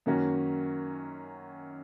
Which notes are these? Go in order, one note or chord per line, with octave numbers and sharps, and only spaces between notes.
F#2 D#3 A#3 C#4 F#4